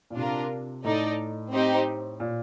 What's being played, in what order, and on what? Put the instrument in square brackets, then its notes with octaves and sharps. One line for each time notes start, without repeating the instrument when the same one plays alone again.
[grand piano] A#2
[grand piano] C3 [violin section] D4 F4 A#4
[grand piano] A2 [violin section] D#4 A4 D5
[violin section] C4 D#4 G4 C5
[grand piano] A#2